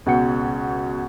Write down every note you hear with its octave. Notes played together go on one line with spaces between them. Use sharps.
C#2 B2 F#5 G5 C#7